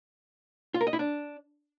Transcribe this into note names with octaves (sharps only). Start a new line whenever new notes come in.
F4
A#4
D#5
E4
D4